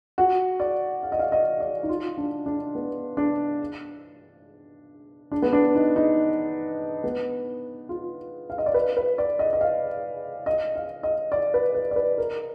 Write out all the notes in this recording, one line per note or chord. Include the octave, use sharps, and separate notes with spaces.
F#4
D5
F5
D#5
F5
D#5
D5
D#4
F4
D4
D4
B3
D4
D4
B3
D4
D#4
D#4
B3
F4
F5
D#5
D5
B4
B4
D5
D#5
D#5
F5
D#5
F5
D#5
D5
B4
B4
D5
B4
A#4